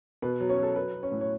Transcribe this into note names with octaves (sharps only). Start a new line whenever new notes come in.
B2 B4
F#3
C#4 C#5
F#3 A4
F#3 B4
F#3
C#4 C#5
A2
C#5